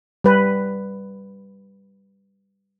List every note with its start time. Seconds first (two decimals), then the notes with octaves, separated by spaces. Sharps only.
0.24 G3 B4